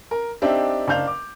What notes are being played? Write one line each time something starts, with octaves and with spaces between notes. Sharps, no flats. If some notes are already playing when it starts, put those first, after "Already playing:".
A#4
C4 D4 D#4 G4 E5
F#1 D4 F5 G6 F7
D6